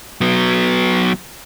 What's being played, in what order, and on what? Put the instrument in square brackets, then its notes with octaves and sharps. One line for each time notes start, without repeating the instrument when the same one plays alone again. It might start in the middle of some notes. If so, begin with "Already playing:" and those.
[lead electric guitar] F#3 B3